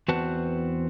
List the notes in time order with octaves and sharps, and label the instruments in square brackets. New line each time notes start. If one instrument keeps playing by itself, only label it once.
[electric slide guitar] E2 C4 F#4 B4 F#5 A5